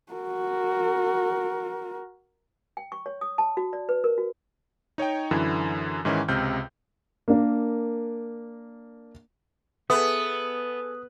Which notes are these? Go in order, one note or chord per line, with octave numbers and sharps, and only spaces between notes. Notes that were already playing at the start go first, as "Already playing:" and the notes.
F#4 A#4
G5
C#6
C#5
D#6
A5
F#4
D5
B4
A#4
F#4
D#4 C#5 D#5 G5
F#2 D3 E3 E4
G#2 D#3 E3 C#4 E4
C#2 C3 F6 G6
A#3 D4 A#4
B3 G#4 A4 B4 E5 D#6